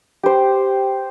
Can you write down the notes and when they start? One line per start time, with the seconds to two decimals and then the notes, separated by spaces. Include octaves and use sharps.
0.23 G4 C5